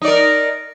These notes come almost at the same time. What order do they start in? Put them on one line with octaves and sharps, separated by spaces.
D#4 D5 A#4